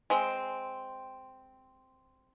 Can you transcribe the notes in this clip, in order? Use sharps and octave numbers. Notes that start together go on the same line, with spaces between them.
G#3 C4